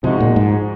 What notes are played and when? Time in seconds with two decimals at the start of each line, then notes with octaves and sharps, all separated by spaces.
0.03 C3 F3 G#3 D#4 F#4
0.20 A#2
0.36 G#2